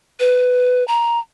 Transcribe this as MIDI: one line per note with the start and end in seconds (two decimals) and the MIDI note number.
0.20 0.86 71
0.88 1.19 82